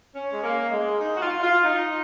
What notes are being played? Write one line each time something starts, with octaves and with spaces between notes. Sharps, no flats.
C#4
G#3
A#3
G#3
D#4
F#4
F4
F4
D#4